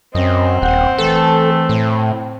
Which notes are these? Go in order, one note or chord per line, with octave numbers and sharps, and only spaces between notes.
F#2 C4 D#5
D#1 F#5 G5
E3 A3 A4
A2